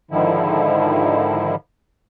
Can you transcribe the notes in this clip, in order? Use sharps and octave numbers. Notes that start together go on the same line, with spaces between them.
G#2 D3 D#3 F3 E4